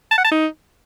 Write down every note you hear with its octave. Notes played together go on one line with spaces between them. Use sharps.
A5
F#5
A5
D#4